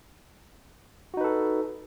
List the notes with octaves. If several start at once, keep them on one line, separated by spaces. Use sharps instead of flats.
D#4 F#4 A4 B4